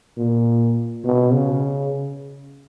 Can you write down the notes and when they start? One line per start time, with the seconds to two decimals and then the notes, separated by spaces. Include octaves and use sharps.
0.17 A#2
1.05 B2
1.33 C#3